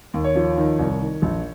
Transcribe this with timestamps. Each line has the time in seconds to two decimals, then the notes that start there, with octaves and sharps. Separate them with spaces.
0.14 D#2
0.24 C#5
0.35 F3
0.58 D#3
0.79 C2
1.01 D#3
1.22 A#1